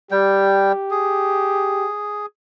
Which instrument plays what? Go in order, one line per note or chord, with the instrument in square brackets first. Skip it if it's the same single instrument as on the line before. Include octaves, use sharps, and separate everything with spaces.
[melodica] G3 G5 [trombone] G4
[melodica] G#4